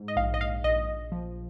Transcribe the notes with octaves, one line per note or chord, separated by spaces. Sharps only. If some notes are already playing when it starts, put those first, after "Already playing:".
Already playing: G#2
D#5
A#1 F5
D#5
F5
A#1 D#5
F3